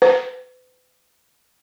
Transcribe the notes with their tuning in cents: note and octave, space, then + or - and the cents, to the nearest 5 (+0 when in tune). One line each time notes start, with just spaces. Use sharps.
B4 +40